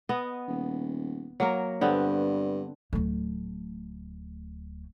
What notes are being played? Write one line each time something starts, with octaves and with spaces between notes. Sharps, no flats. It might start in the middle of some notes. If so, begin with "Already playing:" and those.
B3 D#5
D#1
F#3 A#3 A#4
G2 D3 B3 C4
D1 A3